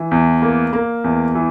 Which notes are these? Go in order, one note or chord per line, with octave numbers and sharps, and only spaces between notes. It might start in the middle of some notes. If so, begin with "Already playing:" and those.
Already playing: E3
E2
A#3
A#3
E2
E3